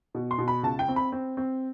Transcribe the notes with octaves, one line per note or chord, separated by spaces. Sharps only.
B2
C6
B2
B5
C#2 A5
G5
C4
B5
C4
C4